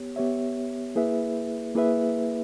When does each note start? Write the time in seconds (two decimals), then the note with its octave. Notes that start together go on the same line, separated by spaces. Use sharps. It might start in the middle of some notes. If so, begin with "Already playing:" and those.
Already playing: B3 G4 C#5
0.16 B3 G4 C#5 E5
0.96 A#3 E4 G#4 B4 E5
1.75 A#3 E4 G#4 B4 E5